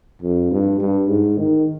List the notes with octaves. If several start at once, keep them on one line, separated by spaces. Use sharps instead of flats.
F2
G2
G2
G#2
D#3